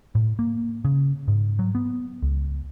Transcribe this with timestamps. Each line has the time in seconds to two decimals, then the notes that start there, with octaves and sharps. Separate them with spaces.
0.15 A2
0.39 A#3
0.85 C#3
1.28 G#2
1.59 F#3
1.75 B3
2.22 C#2